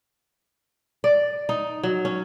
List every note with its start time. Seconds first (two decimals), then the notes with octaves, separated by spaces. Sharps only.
1.04 D5
1.49 D#4
1.83 F#3
2.05 C#4